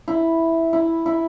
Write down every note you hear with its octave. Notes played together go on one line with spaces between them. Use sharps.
E4
E4
E4